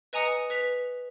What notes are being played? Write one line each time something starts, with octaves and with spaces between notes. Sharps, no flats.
B4 D#5 G#5 A#5 D#6 C#7
B4 B6 F7